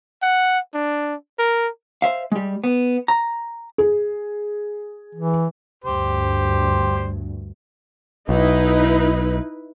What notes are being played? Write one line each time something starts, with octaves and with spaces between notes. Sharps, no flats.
F#5
D4
A#4
C5 E5 F5
G3 G#3
B3
A#5
G#4
E3
D2 G2 G4 C5
B1 D#4 E4 B4